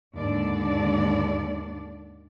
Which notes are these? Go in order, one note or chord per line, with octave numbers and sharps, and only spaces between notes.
D#2 G#2 D3 D4 D5